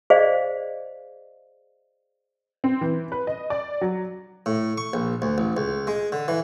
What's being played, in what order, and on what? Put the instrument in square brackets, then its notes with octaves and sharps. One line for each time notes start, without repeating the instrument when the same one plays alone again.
[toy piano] G#4 C5 D5 D#5 F5
[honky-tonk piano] C4
E3
B4
D#5
D5
F#3
[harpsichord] A2
C#6
A#1
D2
A1
C#2
G#3
D3
E3